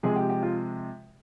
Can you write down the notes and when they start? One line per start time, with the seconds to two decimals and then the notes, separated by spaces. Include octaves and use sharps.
0.03 C3 F3 G#3 G#4
0.16 G4
0.30 G4
0.43 F4